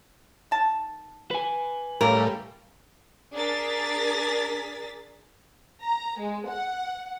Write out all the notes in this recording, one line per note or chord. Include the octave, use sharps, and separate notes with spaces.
D#3 A5
B4 G#5
A2 C#3 G3 A#3 A#4
D4 G#4 A#4 A6 B6
A#5
G#3
F#5